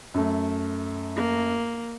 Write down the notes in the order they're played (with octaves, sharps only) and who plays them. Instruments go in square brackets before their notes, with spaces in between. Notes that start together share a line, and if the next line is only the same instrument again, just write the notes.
[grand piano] F#2 A3
[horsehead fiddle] A#3